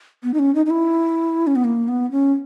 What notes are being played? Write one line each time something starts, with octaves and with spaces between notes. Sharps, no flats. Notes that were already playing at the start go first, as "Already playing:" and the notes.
B3
D#4
C#4
D#4
D#4
E4
C#4
B3
A#3
B3
C#4